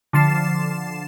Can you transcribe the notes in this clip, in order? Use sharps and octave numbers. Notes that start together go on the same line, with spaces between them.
D3 F3 A6 C7 E7